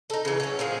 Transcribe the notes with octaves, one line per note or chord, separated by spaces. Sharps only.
D#4 A4
C#3 E3
F#3 C#4
A#2 F3 G#4